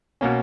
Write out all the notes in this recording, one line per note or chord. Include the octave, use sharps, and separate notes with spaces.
B2 A#3 C#4